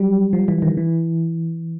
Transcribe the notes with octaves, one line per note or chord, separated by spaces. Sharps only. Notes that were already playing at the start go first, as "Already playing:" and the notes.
Already playing: F#3 G3
F3
E3
D#3
E3